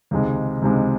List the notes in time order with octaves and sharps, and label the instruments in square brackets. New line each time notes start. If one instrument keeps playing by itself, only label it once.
[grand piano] C#2 C3 D#3 G#3
C#2 C3 D#3 G#3